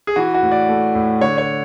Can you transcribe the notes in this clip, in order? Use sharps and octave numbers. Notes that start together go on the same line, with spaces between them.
G#4
E3 F#4
F#4
A2
D5
A3
A2
D3 C#5
C#5